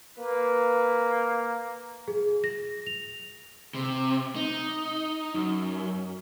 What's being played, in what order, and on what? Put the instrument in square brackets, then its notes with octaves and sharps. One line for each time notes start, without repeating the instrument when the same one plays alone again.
[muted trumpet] A#3 [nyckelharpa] B4
[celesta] G#4
A#6
F7
[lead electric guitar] C3
D#4
F#2